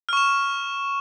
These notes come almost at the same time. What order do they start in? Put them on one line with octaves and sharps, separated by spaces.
F6 C#6 E7